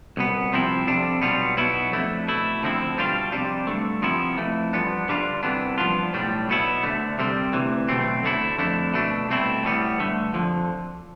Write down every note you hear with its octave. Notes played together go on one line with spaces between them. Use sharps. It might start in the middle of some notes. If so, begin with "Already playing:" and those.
C2 B2 B3
C2 C3 F3 C4 E4
F2 C3 G3 D4
B1 B2 G3 B3 F4
B1 B2 B3 E4
F2 D3 A3 E4
B2 A3 E4
D2 D3 F3 C4 E4
B2 G3 D4 F4
F2 C3 G3 D4
G2 D3 A3
C3 F3 B3 E4
F2 E3 A3
G2 F3 B3 D4
G2 D3 G3 D4 F4
C2 C3 E3 B3 D4
G2 F3 B3 D4 F4
B1 A2 G3 D4
B1 B2 B3 E4
D2 D3 A3
C2 C3 G3 C4
D2 C3 E3
B1 B2 A3 C4
D2 D3 A3 E4
F2 D3 A3 E4
B2 A3 D4
C2 B2 A3 C4 E4
A2 E3 G3 B3
G2 D3 A3
F2 D3 F3